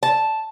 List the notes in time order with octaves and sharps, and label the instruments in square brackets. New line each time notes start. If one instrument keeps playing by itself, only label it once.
[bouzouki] A5